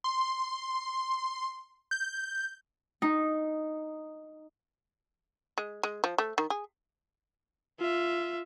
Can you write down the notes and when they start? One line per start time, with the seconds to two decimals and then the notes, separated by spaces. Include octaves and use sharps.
0.04 C6
1.91 G6
3.02 D#4
5.58 G#3
5.83 G#3
6.04 F3
6.18 A3
6.38 D#3
6.50 G#4
7.79 F4 E5